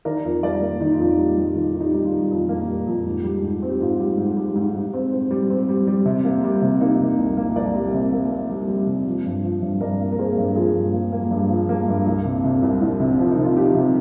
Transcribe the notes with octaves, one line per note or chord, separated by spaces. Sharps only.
D#3 A#4 D5
F2
G3 A#4 D5
A#3
D#3 D#4
F4
F2
D#4
G3
G3
D#3 F4
D#3
D#4 G4
G3
F4
G3
F2
A#3
G3
F2
G#2
G3
G#2
C4
G4
G#2 F4
G3
G#2
G3
G#2
G#2
C4
C4
G3
C4
G3
G3
C3
A#3
G3
C3
A#3 D#4 G4
C3
C2
A#3
C2 A#4 D5
G3
C3
A#3
A#3
G3
G3
C3
F3
G2
F3
G2
G2 A#4 D5
A#3
A#4
A#3 G#4 C5
G2
F3 F4 G#4
G2
A#3
A#3
G2
F3
A#3
G2
C2
C3
C3
C2
C2
C3
F3
D#4
C3
F4
F3 D#4 G4
C3